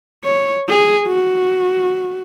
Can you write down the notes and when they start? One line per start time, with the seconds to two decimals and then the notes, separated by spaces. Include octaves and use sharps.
0.24 C#5
0.69 G#4
1.07 F#4